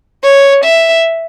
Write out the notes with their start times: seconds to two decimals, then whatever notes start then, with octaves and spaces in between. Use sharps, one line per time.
0.24 C#5
0.65 E5